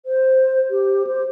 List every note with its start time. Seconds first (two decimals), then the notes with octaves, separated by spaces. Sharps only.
0.06 C5
0.70 G4
1.07 C5